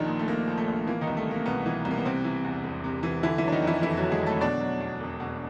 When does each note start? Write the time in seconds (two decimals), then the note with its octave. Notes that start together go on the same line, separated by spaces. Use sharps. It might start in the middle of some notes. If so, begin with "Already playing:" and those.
Already playing: A#1 D#3 F3 D4 D#4
0.08 A#2
0.19 A3
0.28 A#1 A#3
0.48 F3
0.58 A3
0.68 A#1
0.87 E3 A#3
1.01 D#3 D#4
1.07 C2
1.17 A3
1.27 C3 A#3
1.46 C2 B2 B3
1.66 E3
1.85 C2
1.91 A#3
1.97 B3
2.05 C3 C4
2.24 E3
2.44 E2
2.64 E1
2.84 C3
3.03 E3
3.23 D3 E3 E4
3.38 E3 F#3 E4
3.48 D4
3.52 D#3 D#4
3.62 F2
3.67 E3 E4
3.82 F1 E3 E4
3.97 D3 F#3 F#4
4.12 G#3 G#4
4.21 F#3
4.26 A3 A4
4.41 B2 D4 D5
4.60 F#3
4.80 E2
5.01 E1
5.20 B2